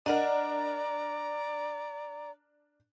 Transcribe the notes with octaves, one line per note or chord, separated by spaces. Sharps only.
D4 A#4 D5 D#5 F#5 A#5